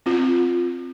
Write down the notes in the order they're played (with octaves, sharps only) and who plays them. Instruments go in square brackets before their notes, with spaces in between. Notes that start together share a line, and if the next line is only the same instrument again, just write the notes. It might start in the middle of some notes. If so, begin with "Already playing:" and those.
[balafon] C4 F4